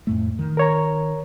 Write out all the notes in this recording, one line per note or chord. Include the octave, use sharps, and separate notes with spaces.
F2 A2 A3
D#3
A#4 C#5 A#5